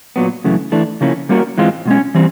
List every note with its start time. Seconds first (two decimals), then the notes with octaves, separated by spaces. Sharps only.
0.16 A#2 F#3 B3
0.44 F#2 C#3 E3 A3
0.72 E3 A3 D4
1.01 C#3 F3 A#3 C#4 E4
1.29 G3 A#3 C#4 F#4 A#4
1.58 G#2 E3 G#3 C4 F4
1.86 B2 G#3 C#4
2.15 E3 G3 C4